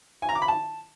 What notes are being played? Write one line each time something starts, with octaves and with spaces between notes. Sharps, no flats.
G#5
A#5
D6
B5
A5